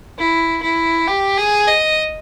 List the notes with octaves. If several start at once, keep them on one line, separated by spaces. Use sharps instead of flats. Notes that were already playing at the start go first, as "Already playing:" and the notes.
E4
E4
G4
G#4
D#5